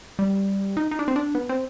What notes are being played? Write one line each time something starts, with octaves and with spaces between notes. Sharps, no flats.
G3
D#4
D#4
D4
C4
D4
B3
C4